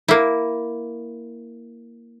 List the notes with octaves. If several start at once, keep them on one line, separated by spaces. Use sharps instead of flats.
A#3 E4